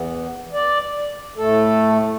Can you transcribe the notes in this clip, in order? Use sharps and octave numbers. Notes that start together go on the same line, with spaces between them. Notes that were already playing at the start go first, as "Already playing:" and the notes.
Already playing: E2 E3 B3
D5
A2 A3 A4